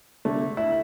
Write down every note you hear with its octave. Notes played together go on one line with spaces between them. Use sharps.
D3 A3
E4